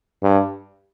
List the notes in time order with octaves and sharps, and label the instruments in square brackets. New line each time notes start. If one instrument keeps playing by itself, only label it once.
[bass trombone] G2